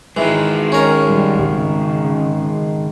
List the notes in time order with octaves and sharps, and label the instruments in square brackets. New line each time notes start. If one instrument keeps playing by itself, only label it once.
[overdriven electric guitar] D#3 G#3 [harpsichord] E3
[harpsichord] C#4 A#4
[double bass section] G3
C#3